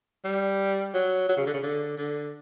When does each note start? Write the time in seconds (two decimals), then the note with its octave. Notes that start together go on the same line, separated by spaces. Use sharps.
0.24 G3
0.94 F#3
1.29 F#3
1.37 C#3
1.46 D3
1.54 C#3
1.63 D3
1.97 D3